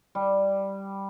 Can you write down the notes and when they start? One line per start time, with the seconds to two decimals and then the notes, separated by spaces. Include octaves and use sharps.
0.15 G3